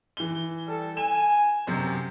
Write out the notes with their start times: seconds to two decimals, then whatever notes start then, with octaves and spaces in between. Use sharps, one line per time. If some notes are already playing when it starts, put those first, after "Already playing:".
0.17 E3 G7
0.67 G3 A4
0.97 G#5 E7
1.68 F#2 C3 F#4 C5